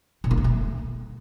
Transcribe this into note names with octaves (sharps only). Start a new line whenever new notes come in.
B2
A#3
B3
A3